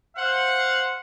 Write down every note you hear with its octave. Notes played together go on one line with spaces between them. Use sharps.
C5 F5 F#5